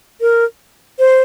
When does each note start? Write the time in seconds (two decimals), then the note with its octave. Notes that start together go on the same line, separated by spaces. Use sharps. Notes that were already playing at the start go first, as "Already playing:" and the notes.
0.21 A#4
0.99 C5